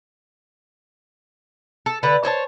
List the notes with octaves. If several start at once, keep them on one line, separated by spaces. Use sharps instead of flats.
A4
D3 B4 F#5
C5 C#5 D#5 A5